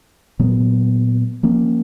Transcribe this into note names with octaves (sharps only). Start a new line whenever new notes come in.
A#2 F#3 B3
F3 A#3 C#4